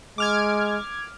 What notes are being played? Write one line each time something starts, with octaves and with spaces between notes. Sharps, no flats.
G#3 D6 F6 G#6